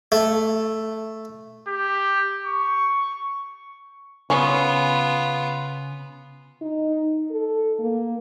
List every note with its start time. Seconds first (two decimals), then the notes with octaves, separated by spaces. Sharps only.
0.12 A3
1.68 G4
2.46 C#6
4.30 C#3 B3 C#4 F4
6.61 D#4
7.31 A4
7.79 A#3